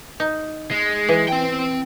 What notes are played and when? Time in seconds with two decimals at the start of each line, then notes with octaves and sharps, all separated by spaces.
0.20 D#4
0.71 G#3
1.09 E3
1.28 C4 G5